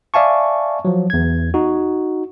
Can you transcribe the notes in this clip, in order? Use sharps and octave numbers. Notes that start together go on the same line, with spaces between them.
D5 E5 F5 G#5 A5 C#6
F3 F#3
E2 G#6
D#4 F#4